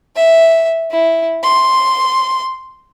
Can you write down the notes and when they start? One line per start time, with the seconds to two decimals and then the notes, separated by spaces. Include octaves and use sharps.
0.16 E5
0.91 E4
1.43 C6